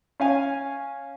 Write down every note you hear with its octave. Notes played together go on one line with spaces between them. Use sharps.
C#4 F5 G#5